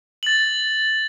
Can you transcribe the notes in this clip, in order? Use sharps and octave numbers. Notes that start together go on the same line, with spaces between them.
A6 F#7